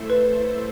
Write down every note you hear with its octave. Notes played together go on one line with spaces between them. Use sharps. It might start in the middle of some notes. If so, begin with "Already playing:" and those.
Already playing: A3 E4 A4 C5 E5
B4